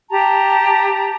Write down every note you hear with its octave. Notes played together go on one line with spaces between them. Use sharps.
G4 A5 A#5